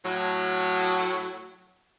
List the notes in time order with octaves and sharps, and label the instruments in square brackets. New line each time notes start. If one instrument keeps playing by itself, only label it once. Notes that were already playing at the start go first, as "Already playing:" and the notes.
[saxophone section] A2 F#3